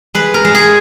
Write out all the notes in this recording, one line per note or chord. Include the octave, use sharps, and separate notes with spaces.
G#3 B4
A#4
G#3
G#4